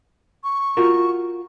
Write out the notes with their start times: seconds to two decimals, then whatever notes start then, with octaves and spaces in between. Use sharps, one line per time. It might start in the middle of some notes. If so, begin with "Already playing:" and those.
0.44 C#6
0.77 F4 F#4 A#4